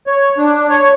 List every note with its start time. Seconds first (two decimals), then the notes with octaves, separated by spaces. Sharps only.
0.07 C#5
0.38 D4
0.70 C#5